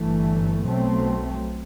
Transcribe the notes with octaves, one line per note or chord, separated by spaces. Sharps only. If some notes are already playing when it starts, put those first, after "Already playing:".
Already playing: G1 G2 E3 A3
B1 B2 F#3 A3 C4